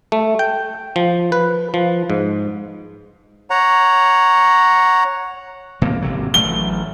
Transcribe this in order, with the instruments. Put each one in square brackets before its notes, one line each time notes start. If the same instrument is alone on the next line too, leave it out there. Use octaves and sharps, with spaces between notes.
[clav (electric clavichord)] A3
G5
F3
B4
F3
G#2
[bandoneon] C#5 F#5 A#5
[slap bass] B2 A#3 C4
G#1 C3 F#3
[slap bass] A1 F#3 A3 [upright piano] G7